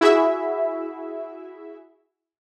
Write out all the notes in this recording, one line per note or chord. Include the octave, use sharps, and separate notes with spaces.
E4 F#4 G#4 E5